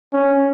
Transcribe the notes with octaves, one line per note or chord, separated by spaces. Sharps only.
C#4